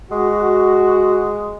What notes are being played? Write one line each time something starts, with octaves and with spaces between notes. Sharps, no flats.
G#3 F#4